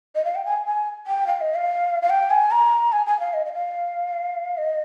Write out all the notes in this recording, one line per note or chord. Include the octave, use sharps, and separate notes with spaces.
D#5
F5
G5
G#5
G#5
G5
F5
D#5
F5
F5
G5
G#5
A#5
G#5
G#5
F5
D#5
D#5
F5
D#5